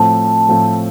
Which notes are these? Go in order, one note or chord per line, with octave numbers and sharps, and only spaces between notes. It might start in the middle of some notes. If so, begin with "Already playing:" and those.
Already playing: A2 F3 A3 C4 A5
A2 F3 A3 C4